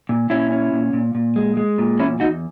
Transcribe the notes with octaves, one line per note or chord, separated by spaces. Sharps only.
A#2
A#2 C#4 E4
C#4
A#2
A#2
A#2
G#3
G#3
A#2
E2 C#4 E4
E2 D#4 F#4